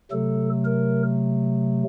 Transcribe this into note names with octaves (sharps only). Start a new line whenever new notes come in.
C3 F#3 A3 A4
A#4